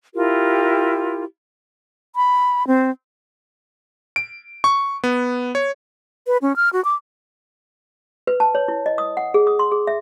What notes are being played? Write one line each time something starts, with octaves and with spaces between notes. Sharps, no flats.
E4 F4 G4 A#4
B5
C4
D7
C#6
B3
C#5
B4
C#4
F6
F#4
D6
B4
A5
C#5
E4
D#5
D#6
F#5
G#4
D#6
C6
G#4
E5